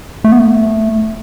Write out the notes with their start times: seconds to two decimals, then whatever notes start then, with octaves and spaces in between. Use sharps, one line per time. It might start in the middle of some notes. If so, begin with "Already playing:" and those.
0.24 A3
0.32 B3
0.39 A3